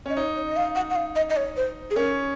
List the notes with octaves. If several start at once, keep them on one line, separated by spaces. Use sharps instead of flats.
C#4 D#5
D#4 C#5
C#5
D#5
F5
F#5
F#5
F5
D#5
D#5
C#5
C5
G#4
C#4 A#4